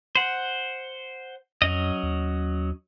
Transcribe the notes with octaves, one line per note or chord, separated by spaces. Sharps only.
C5 F#5
F2 F#3 C#4 D#5
D#2